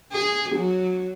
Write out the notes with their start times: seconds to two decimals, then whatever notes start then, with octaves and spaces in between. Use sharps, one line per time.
0.12 G#4
0.55 F#3